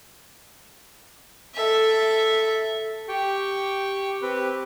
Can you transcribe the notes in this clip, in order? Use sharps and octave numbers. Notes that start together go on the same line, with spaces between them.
A4 E5
G4 G5 C#6
C4 G4 B4